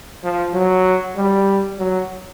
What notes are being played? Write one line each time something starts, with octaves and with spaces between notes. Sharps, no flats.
F3
F#3
G3
F#3